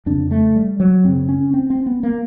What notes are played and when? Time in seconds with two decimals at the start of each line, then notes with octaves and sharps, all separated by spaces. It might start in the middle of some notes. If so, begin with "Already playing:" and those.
0.06 F2 C#3 D4
0.31 A3
0.56 G3
0.80 F#3
1.04 F#2 C#3 C4
1.29 C#4
1.54 C4
1.70 C4
1.86 B3
2.03 A#3